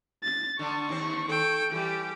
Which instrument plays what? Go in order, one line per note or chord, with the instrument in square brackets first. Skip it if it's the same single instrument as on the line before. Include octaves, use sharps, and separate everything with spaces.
[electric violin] A6
[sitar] D3 D4 [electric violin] C#6
[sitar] D#2 C4 C5
[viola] A4 G5
[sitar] E3 G3 [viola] G4